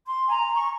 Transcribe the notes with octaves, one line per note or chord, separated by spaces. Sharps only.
C6
G#5
A#5
C#6